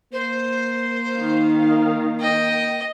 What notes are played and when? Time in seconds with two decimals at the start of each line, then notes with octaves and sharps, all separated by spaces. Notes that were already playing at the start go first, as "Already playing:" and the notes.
0.13 A#3 C5
1.16 D#3 F5
2.20 D#5 G5